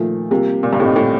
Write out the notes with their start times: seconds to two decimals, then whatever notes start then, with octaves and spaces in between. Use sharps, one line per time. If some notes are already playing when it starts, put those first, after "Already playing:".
Already playing: A#2 D#3 F3 A3
0.31 C3 G3 A#3 F4
0.63 A#2
0.73 G2
0.80 A2 G3 C4 D#4
0.96 A2